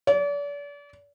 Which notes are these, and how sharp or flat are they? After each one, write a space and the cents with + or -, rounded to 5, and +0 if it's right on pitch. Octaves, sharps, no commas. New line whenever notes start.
D5 -40